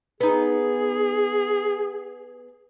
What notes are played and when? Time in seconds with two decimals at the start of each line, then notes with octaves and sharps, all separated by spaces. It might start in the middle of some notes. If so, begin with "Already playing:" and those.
0.20 B3 D#4 G#4